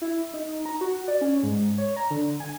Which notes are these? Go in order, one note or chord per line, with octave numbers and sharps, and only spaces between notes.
E4
D#4
A#5
F#4
D5
C#4
G#2
C#5
A#5
D3
G#5